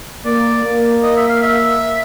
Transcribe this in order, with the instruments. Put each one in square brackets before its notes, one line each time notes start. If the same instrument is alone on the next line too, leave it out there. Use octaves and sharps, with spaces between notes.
[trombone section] A#3 [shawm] D5
[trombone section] A#3
[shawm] D#5
E5
F5
E5